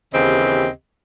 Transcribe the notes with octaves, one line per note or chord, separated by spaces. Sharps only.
D#2 C#3 E3 C4 G4 D#5